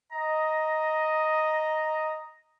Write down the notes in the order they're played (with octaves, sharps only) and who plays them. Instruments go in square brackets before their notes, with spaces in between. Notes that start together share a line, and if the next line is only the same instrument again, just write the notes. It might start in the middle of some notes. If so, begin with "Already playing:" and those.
[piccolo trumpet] D#5 [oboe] A#5